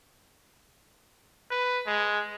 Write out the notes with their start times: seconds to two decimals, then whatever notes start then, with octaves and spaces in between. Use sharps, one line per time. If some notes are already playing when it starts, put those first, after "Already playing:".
1.51 B4
1.87 G#3